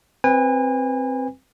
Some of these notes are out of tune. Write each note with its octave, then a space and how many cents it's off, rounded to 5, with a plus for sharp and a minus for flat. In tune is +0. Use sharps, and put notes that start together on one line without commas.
C4 +5 B4 +0 G#5 -35